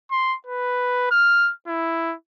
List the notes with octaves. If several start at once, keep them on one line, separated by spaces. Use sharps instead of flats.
C6
B4
F6
E4